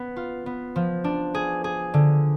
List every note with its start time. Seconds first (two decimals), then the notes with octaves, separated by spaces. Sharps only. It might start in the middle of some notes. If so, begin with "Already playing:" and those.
Already playing: B3
0.16 F4
0.46 B3
0.76 F3
1.04 D4
1.34 G#4
1.64 G#4
1.94 D3